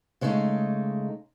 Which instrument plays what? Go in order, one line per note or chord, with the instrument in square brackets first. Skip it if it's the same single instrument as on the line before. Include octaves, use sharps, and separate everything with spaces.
[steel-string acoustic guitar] C#3 G#3 A3 C#4 D#4